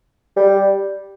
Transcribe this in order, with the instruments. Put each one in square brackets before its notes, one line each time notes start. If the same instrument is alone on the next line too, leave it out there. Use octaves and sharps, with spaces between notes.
[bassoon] G3